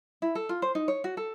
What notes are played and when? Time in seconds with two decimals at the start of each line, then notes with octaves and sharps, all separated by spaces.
0.22 E4
0.35 A4
0.49 F4
0.62 C5
0.75 D#4
0.88 C#5
1.04 F#4
1.17 A4